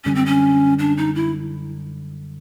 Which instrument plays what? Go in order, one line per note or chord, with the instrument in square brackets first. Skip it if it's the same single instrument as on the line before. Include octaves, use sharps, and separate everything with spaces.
[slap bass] F#2 D3 G3 [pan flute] C#4
[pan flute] C4
C#4
D4
D#4
E4